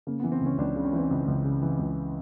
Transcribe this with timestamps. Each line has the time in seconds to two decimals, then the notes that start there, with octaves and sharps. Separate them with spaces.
0.07 C#3 A#3
0.19 B3
0.24 E3
0.32 C4
0.41 C#2 C#4
0.58 C#2 D4
0.76 C#3
0.85 C#4
0.93 E3 C4
1.11 C#2
1.28 C#2
1.45 C#3
1.62 E3
1.79 C#2